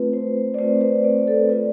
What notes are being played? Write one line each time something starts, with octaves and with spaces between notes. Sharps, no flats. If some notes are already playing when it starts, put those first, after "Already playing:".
Already playing: A3 C4 F4 B4
C5
D5
A3 C4 F4 C5
B4
D5
A4
A3 C4 F4 B4